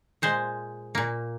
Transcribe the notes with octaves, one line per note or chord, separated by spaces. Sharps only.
A#2 G#3 C5
A#2 A#3